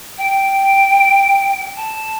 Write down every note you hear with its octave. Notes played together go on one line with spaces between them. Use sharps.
G5
A5